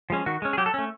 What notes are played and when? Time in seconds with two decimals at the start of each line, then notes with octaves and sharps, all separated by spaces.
0.10 F3 G#3 C#4
0.26 D#3 F#4
0.42 G#3 C#4
0.53 G#4
0.57 F#3 G4
0.66 A4
0.74 A3 C#4